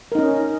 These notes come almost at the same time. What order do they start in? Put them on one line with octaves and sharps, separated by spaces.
A#4 D#4 C#4